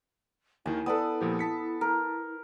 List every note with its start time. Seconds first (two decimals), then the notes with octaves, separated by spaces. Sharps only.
0.66 D#2 D#3 E4 G#5
0.86 B3 A4 B4 D5 D#6
1.21 A#2 F3 G4
1.39 A5 B6 C#7
1.81 A#4